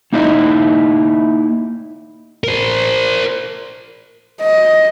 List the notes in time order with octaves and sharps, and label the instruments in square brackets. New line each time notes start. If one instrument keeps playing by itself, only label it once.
[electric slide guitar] A#3 D#4 E4 D#5
[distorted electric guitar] A#4 C5
[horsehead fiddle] D#5